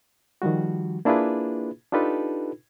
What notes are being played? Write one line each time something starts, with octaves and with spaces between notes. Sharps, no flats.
D#3 F3 G3 F#4
A#3 D4 E4 F4 G#4 B4
D4 D#4 F4 G4 A4 B4